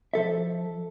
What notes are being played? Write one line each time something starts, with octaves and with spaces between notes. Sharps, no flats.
F3 A4 E5